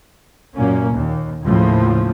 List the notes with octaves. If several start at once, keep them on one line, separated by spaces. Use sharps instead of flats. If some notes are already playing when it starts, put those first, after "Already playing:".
F#2 A#2 A#3 C#4
D#2
D#2 A2 C#3 F3